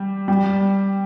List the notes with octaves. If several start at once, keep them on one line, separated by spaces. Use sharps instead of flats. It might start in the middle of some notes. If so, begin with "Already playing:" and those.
Already playing: G3
G3